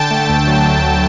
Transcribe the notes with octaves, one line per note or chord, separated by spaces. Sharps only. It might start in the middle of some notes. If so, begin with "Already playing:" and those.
Already playing: D3 G5 A5
A3
D2
F#3
D3
A3